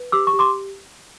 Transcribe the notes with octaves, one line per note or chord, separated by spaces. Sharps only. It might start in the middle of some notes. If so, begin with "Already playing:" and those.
Already playing: B4
G4 D6 E6
C#6
G4
C6 D6